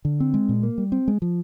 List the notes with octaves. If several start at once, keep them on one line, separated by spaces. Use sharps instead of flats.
D3
C4
G#3
A#2
A#3
G3
C4
G#3
F3